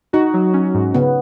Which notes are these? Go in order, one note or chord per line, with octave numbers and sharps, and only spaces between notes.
D#4 F#4
F#3
C#4
G#2
C#3 B3